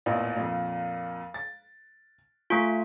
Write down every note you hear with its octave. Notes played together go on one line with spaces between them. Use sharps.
A1 E2 A#2
F2 A#2
A6
A3 F4 G#5 C6 C#6